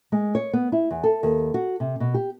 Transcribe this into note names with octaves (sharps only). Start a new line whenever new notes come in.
G#3
C#5
B3
E4
E2
A4
D#2
F#4
C3
B2
G4